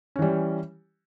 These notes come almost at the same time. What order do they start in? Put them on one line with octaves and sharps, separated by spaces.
C#4 E3 G3